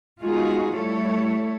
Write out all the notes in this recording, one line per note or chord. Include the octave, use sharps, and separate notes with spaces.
G#3 B3 D#4 F4 F#4 G#4
G3 A3 E4 A4 C#5